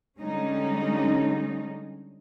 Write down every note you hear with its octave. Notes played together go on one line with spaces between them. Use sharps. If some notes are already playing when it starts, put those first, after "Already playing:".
D3 G3 G#3 C#4 D#4